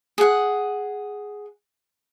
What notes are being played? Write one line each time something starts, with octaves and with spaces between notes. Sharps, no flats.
G#4 F#5